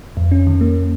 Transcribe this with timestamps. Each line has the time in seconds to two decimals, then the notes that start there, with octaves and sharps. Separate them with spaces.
0.17 F2
0.32 C#4
0.47 D#3
0.61 A#3